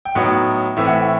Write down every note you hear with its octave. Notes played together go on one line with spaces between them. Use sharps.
G5
A2 F#3 B3 D#4 F#5
A2 E3 A3 C4 E5
F#5
E5